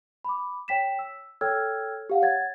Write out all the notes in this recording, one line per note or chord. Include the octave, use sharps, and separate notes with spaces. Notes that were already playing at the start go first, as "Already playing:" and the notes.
B5 D6
C#5 G5 B6 E7
E6
A4 C#5 G5 E6 F6 G#6
G4 F5 F#5
C#5 F#5 G#6 A6